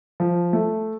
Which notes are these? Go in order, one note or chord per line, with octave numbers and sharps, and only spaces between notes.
F3
A3